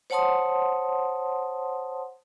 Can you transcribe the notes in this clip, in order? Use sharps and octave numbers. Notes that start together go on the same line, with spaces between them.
C5 C#5 F#5 A5 C6 D#6